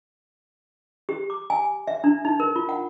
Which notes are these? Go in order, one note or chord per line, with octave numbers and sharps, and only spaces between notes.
G4
D6
G#5
E5
D4
D#4
A#4
F4
F#5